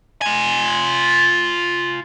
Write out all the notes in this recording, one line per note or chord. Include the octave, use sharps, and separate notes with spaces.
F4 G#5